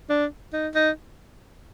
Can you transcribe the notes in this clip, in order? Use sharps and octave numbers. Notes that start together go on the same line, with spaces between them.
D4
D#4
D#4